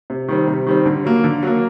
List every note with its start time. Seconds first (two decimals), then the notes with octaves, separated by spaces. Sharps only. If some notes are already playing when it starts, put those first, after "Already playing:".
0.10 C3
0.28 D#3 G3 C4
0.48 C3
0.66 D#3 G3 C4
0.85 D3
1.04 F#3 A#3
1.24 D3
1.43 F#3 A#3